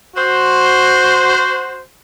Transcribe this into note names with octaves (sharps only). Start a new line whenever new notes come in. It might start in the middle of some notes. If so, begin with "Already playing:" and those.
F#4 C5